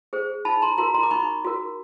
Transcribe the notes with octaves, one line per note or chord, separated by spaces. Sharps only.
G#4 C5
D#4 A5 B5
A#5 C6
F#4 A#4 A#5 C6
A#5 C6
D6
D#4 B5 C#6
F#4 A#4